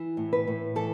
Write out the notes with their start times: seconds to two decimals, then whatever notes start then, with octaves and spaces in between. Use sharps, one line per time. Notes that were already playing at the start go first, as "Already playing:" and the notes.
Already playing: E3
0.17 A2
0.33 B4
0.47 A2
0.76 E3 A4